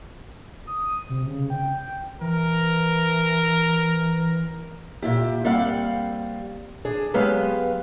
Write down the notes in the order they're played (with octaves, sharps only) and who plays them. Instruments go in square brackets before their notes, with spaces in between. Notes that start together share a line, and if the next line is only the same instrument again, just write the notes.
[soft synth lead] D#6
C3
C#3
G5
[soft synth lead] E3 [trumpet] A#4
[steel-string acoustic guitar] A#2 E4 G4
G3 A#3 C4 F5 F#5
D4 G#4
F#3 G#3 B3 G4 B4 F5